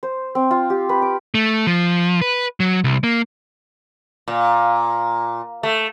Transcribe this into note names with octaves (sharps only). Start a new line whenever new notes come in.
C5
C4
F4
G4
B4
D6
A3
F3
B4
F#3
C2
A#3
A#2
A3